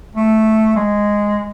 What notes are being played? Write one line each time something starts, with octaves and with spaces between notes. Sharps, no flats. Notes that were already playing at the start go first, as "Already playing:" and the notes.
A3
G#3